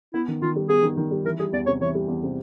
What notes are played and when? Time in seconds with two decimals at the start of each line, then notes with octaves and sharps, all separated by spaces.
0.13 B3 E4
0.28 D#3
0.42 D#3 F4
0.56 G3
0.69 B3 G#4
0.83 D#3
0.97 D#3
1.11 G3
1.25 E3 A#4
1.39 G3 G#4
1.53 E2 D5
1.66 C3 C#5
1.81 E3 C#5
1.95 G3
2.08 E2
2.23 C3